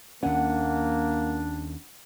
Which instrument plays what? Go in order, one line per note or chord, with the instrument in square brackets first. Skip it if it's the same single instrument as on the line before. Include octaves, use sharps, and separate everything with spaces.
[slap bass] D#2 C#4 [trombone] A#3 [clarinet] D4 [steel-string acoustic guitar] F#5